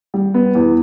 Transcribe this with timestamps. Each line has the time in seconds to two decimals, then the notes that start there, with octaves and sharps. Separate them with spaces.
0.14 G3
0.34 B3
0.55 E2